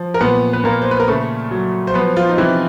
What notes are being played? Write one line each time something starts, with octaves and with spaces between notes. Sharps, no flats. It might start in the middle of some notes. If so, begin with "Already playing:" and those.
Already playing: F3
A#4
A#2 B3 B4
B4
A#2 A#3 A#4
C5
B4
A#4
C#3 A3 A4
F#3
C5
F3 B3 B4
F3 F4
D#4
C3 E3 E4